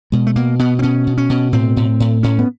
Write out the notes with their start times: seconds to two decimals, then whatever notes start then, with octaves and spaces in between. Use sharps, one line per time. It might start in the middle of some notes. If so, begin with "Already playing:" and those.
0.12 B2 G#3
0.27 A3
0.36 B2 A#3
0.59 B2 B3
0.79 C4
0.82 B2 C#4
1.07 B2
1.18 C#4
1.30 B2
1.52 A2 C4
1.77 A2
2.00 A2
2.23 A2 C#4
2.39 B3